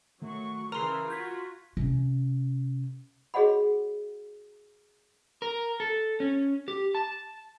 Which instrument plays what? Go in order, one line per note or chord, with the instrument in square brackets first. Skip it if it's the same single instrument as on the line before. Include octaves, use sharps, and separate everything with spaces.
[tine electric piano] D#3 A3 [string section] F#3 C#6
[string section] C#3 E3 [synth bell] A#4 C7 [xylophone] A#5 C6 [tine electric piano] F6
[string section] F4 F#4 [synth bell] G6 G#6 B6
[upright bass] C3 C#4
[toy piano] F#4 G#4 C#5 D#5 F#5 B5
[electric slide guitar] A#4
A4
C#4
G4
A5